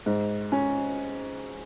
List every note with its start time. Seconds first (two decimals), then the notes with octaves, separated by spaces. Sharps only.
0.06 G#2
0.52 C#4